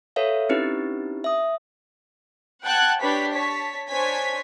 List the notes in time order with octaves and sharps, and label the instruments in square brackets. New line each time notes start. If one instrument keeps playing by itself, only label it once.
[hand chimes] A4 B4 C#5 E5 F5
C4 C#4 D#4 E4 G4 B4
E5 D#6
[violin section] F#5 G5 A5 F#6 G#6
D4 G4 B4 C#5 B6
C#5 A5 B6
D4 C5 C#5 G#5 G#6 B6